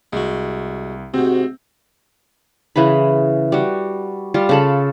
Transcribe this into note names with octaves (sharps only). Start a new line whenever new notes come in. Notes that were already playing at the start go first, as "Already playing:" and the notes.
C2 G#3 F#4
G#2 C3 C4 F#4
C#3 E3 G#4 B5
G3 F#4
G3 F4
C#3 A4 B5